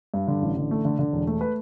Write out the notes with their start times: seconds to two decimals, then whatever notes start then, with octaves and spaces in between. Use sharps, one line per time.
0.14 G2
0.28 D3
0.42 A1
0.56 D3
0.71 A3
0.85 D3
0.99 D3
1.13 E1
1.27 A3
1.41 B4